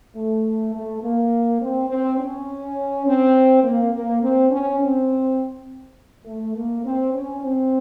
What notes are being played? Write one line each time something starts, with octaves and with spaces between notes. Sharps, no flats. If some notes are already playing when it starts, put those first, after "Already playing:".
A3
A3
A#3
C4
C4
C#4
C4
A#3
A#3
C4
C#4
C4
A3
A#3
C4
C#4
C4